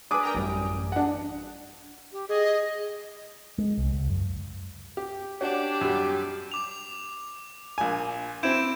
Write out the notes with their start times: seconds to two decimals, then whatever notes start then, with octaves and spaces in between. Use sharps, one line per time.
0.11 D4 B4 G#5 D6 D#6
0.23 A#4 G5 A#5
0.35 A1 F#2 G3
0.92 D4 F#5
2.12 G4
2.29 G#4 D#5
3.58 G#3
3.78 C2
3.93 C#2
4.10 F#2
4.97 G4
5.41 C#4 D4 F#4 G4 D5
5.81 F#2 G3
6.52 D6 F7
7.78 A#1 G#5
8.43 C4 E4 G6 D7 E7